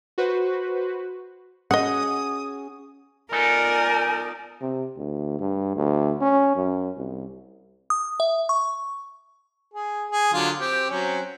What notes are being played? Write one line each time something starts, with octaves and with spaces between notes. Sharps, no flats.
F#4 B4 C5
C#4 F#4 G#4 D#5 F#5 D#6
B3 D#4 F4 A4 A#4 D5 G#5
C3
D2
G2
D2
C#4
F#2
C2
D#6
E5
C#6
G#4
G#4
D3 F#3 F4
C4 G4
F#3 C4 C#4